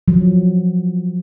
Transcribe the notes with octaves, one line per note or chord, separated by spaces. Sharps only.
F3 F#3